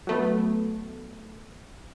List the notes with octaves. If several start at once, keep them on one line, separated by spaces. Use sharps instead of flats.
F#3 A3 B3